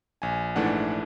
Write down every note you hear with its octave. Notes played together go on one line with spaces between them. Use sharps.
A#1 G#5
G#2 E3 A3 D4 F#5